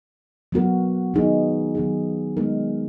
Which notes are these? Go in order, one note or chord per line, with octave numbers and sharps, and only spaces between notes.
F#3 B3 F#4 A#4
D#3 F#3 B3 D#4 G#4
D#3 F#3 B3 D#4 G#4
D#3 G#3 B3 D#4 A#4